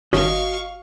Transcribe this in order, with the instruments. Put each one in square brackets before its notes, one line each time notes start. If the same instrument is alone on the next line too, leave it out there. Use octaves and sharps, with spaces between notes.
[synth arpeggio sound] G1 D#3 C#4 [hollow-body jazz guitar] F#4 D#5 [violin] F5 C#6